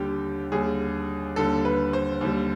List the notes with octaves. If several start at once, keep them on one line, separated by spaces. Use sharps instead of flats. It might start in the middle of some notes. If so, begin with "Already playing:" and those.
Already playing: D#2 D3 G3 G4
D#2 D3 G3 G#4
D#2 D3 G3 A4
B4
C5
D#2 D3 G3